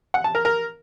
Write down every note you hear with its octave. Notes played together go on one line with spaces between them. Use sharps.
F#5
A5
A#4
A#4